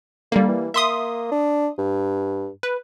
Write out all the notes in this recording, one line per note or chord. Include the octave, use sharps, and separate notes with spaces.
D3 G3 A#3
E3
A#3 E5 C6 D#6
D4
G2
B4